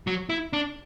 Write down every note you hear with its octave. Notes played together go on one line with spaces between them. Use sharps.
F#3
E4
D4